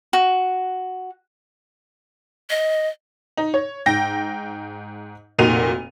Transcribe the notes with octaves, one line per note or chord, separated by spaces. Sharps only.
F#4
D#5
D#4
C#5
G#2 G5 A#6
F1 A#2 D#4 F#4 D#7 F7